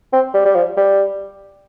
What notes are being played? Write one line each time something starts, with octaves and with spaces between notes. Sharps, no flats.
C4
G3
G3
F3
G3